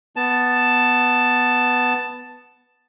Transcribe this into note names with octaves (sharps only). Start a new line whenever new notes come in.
B3 A5